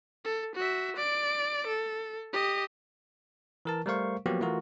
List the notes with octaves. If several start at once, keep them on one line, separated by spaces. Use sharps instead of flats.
A4
F#4 E5
D5 D7
A4
G4 D#5
E3 A#4 A5
G3 A3 A#4 C5 F5 C#6
F3 F#3 A#3 B3 F#4 G4
E3 A3 F4 F#4 A#4